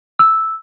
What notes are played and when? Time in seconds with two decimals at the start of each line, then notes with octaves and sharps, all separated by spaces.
0.19 E6